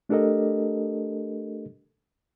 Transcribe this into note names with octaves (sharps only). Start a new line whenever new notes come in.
A3 D4 G4 A4 A#4 D#5